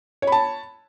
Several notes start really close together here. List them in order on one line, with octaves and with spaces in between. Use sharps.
C#5 B5 A5